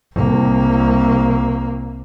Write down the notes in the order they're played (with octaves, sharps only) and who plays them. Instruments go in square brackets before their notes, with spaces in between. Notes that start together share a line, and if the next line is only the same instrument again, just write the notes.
[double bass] C2 A#3